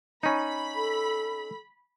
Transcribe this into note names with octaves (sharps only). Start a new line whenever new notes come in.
C#4 D#4 B5
A4